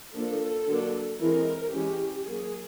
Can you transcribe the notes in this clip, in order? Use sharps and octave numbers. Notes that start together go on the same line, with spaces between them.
F3 A#3 D4 A4
D3 F#3 A#3 D4
E3 G#3 C4 A#4
E3 G#3 C#4 G4
F#3 A#3 C#4 G#4